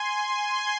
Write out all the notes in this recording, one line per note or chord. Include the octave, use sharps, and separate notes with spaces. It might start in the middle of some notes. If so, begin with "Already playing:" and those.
Already playing: G#5 C6
G#5 C6